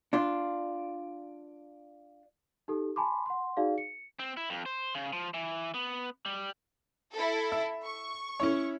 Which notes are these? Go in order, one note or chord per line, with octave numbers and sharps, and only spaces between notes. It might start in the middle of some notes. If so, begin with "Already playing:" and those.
D4 F4
D#4 G4 A4
G#5 A5 B5 C6 D6
F#5 C6
D#4 F#4 G#4 D5 F5
C#7
C4
E4
F2
C5
C#3
F3
E3
B3
G3
E4 A4
E5
C#6
C#4 E4 C#5